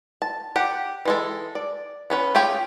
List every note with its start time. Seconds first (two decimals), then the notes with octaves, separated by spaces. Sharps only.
0.22 A5
0.56 G4 F#5
1.05 E3 G#3 A4
1.55 D5
2.10 B3 C#4 B4
2.35 C#4 F4 G4 G#4 G5